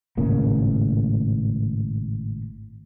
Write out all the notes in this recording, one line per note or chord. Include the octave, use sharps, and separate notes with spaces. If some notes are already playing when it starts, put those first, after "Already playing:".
G#1 A2 C#3 A#3